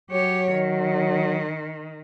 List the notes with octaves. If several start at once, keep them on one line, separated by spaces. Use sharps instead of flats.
F#3 G4 C#5
D#3